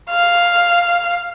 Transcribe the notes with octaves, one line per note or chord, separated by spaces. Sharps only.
F5